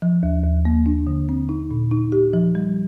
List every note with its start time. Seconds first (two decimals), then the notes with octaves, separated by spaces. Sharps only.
0.02 F3
0.23 D#2
0.44 D#2
0.65 A#3
0.86 D4
1.07 D3
1.29 C4
1.49 D#4
1.71 A#2
1.91 D#4
2.12 G4
2.33 F3
2.55 G3